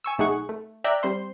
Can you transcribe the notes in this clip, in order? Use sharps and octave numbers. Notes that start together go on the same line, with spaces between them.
G#5 C#6 E6
B1 A3 D#4 G#4 F#5 C#6
A3
D5 E5 G5 A#5 F#6 B6
G3 C4 C5 C6